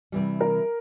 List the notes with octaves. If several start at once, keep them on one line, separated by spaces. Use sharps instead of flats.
C3 E3 G3
A#4